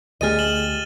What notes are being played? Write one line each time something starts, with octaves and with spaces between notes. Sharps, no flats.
D2 A3 G4 G#4 D#5 F6 A6 D#7
E7 F#7 G7